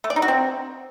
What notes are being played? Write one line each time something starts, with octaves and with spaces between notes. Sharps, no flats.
A3
D5
D#4
F#4
C4